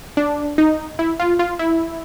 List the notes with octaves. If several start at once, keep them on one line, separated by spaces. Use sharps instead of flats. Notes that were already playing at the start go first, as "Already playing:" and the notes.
D4
D#4
E4
F4
F4
E4